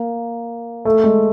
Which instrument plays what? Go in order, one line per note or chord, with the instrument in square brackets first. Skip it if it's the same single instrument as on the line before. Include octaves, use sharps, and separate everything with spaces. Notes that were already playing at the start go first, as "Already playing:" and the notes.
Already playing: [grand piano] A#3
A3
G#3